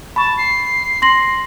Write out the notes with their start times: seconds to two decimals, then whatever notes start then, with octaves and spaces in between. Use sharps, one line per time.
0.16 A5 B5 C#6
0.38 C7
1.02 C6 A#6 F#7